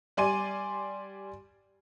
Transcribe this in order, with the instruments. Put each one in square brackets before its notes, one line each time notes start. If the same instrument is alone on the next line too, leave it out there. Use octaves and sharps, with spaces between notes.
[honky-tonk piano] G3 D5 G#5 C6 D#7